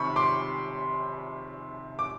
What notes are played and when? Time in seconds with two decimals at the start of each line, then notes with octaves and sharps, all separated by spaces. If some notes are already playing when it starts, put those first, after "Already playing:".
Already playing: C3 D#3 B5 C#6
0.16 C6 D6
1.99 D6